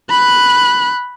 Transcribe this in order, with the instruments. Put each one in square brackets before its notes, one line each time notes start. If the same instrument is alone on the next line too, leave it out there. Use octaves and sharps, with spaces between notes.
[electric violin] B5 F#6